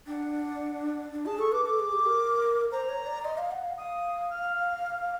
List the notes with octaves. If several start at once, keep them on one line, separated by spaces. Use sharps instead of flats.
D4 F#5 G5
D4
G#4 A5
A4 C#6
B4 D6
A4 D6
G#4
G4
A#4
C5 A#5
C#5
D5
D#5 C6
F5
F#5
F5
F5 D#6
F6